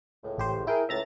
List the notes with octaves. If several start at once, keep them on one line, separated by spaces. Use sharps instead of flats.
C#2 A2
A1 G4 C5
E4 G#4 A#4 G5
C#2 A2 E5 A#5 A6